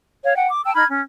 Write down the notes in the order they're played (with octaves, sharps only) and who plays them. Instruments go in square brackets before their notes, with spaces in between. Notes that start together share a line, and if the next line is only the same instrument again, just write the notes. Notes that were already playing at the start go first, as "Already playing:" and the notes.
[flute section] C#5 F5
F#5 G5
D6
G5 A5 E6
D#4 B5 F6 G#6
C#4